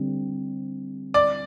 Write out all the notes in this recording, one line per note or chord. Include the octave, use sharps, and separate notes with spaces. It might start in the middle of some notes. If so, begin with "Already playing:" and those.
Already playing: D3 G3 C4
D5 D6